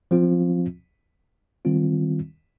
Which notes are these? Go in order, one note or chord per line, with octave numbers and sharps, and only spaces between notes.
F3 C4 F4
D#3 G3 C4 F4